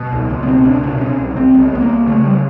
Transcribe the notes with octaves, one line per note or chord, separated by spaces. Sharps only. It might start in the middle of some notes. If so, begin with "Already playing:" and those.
Already playing: B2
C#2
C#2
B3
B2 C4
C#2 D4
B2 D4
C3 C#4
C2
C2 C4
C2 B3
C2 B3
A#3
C2
C#3 A3
G3